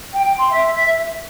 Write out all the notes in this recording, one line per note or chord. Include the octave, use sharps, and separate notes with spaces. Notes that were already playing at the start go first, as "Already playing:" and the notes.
G5
G5
C6
E5